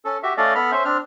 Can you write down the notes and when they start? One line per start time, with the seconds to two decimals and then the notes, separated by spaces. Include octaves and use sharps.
0.05 C#4 A4
0.23 F#4 G4 E5
0.38 A3 C#4 A4 D5 D#5 F5
0.55 B3 A4 B5 F6
0.72 C#4 C5 E5
0.85 C4 D4 F6